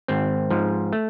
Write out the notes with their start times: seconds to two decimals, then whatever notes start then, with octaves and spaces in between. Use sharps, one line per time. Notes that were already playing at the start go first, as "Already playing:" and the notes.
0.08 G#1 C4
0.50 G#2 F3
0.93 A3